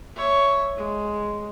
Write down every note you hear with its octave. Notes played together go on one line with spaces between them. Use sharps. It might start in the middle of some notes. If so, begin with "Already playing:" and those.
C#5 E5
G#3